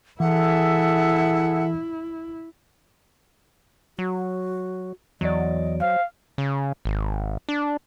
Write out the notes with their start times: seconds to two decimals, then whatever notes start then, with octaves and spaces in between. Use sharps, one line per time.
0.20 E3 E4 G#4 A4 E5 F#5
3.99 F#3 F#4
5.21 E2 F#3 D5 D#5
5.81 C5 F5
6.38 C#3
6.85 G#1
7.49 D4